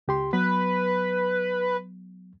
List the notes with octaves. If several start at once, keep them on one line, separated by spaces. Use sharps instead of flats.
C#2 G4 C6
F#3 B3 B4